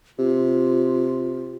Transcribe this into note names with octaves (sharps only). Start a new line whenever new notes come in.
C3 F4